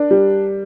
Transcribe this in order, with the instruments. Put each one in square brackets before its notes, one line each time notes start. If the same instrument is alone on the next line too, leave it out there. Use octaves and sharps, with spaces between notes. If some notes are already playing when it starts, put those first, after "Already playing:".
Already playing: [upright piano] D4 [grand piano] A#4 D5
[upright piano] G3